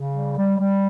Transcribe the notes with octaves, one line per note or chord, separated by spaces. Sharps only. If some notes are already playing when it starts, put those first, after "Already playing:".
Already playing: C#3
G3
G3
G3